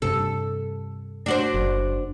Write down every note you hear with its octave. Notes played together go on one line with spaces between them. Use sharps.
G2 C3 A4
D4 F#4 C5
F#1